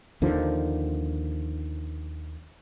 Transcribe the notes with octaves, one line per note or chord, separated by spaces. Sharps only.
D#2 D3 D#3 F3